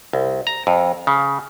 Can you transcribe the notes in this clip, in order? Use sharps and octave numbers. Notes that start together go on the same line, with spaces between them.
C2
A#5
F2
C#3